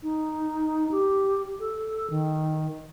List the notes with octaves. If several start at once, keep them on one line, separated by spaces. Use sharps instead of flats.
D#4
G4
A4
D#3